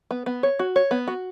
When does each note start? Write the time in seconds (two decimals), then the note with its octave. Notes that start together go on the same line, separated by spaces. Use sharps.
0.11 B3
0.26 B3
0.43 C#5
0.59 F#4
0.76 C#5
0.91 B3
1.07 F#4